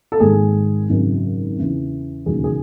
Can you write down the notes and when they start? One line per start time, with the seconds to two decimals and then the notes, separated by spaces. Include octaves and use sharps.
0.12 A4
0.20 G#1 G#2 D#3 G#4
0.90 G#1 F#2 C#3 F#3
1.57 E2 C#3 E3
2.25 E1 D#2 C#3 F#3 G#4
2.44 G#4